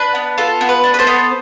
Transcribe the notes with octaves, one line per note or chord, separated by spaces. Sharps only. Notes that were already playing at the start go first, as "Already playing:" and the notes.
Already playing: D4 B4
B3
F4 A4
B3
B4
D4
B4
A4 C5
B3